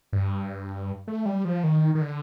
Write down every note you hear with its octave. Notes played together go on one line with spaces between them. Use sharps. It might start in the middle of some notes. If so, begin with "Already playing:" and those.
G2
A3
G3
F3
D#3
D#3
D3